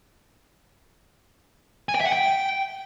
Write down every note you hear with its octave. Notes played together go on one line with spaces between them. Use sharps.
G#5
G5
E5
F#5
G5